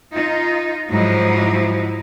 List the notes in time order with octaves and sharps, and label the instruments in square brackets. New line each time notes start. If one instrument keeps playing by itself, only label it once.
[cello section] D#4 F4
[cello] G#2 F3 [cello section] F#3 D#4 E4